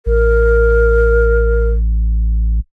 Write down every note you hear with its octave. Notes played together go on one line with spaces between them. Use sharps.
A1 A#4